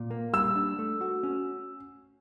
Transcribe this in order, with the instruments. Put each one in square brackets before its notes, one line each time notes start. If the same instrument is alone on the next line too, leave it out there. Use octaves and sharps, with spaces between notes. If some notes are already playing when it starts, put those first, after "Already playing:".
Already playing: [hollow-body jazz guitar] A#2
A#3
[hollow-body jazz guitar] G3 [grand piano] E6
[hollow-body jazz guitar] D4
A3
F#4
C#4